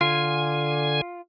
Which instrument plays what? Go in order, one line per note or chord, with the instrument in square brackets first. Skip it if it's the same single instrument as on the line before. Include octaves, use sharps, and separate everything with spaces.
[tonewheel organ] D3 G#5 [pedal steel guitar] F4